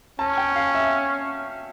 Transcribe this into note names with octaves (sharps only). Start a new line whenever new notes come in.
C#4 A5
G5
F5
E5